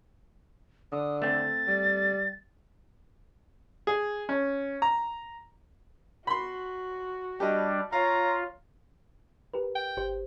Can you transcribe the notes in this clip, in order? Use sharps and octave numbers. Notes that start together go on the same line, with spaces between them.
D3 D#6
A3 C4 A6
G3
G#4
C#4
A#5
F#4 B5 C6
G3 D4 G4 D#5
F4 C#5 F5 A#5
G4 A#4 B4
G5
G1 G4 C5